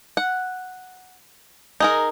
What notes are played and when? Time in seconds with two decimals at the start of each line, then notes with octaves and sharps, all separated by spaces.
0.17 F#5
1.80 D#4 G#4 A#4